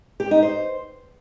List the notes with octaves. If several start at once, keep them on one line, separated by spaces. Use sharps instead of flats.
G4
D#4
C5